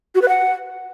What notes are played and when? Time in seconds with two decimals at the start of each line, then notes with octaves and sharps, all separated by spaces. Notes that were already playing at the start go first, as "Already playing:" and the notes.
0.15 F#4
0.22 B4
0.29 F#5